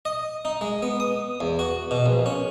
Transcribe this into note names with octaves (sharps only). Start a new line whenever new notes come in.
D#5
D#4
G#3
B3
D#6
E2
F#4
B2
A#1
C#4